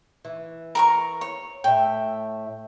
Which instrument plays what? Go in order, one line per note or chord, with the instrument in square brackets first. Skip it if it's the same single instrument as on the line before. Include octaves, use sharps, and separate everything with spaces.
[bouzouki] E3
[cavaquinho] A#4 A#5 C#6
C#5
[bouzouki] A2 E5 [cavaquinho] G5